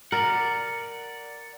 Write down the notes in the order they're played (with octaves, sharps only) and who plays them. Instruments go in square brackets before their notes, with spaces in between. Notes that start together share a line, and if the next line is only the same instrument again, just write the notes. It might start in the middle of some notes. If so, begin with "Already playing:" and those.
[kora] A#4 [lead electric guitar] D5 F#5